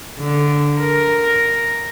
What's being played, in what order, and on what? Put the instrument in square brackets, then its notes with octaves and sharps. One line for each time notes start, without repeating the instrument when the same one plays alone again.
[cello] D3
A#4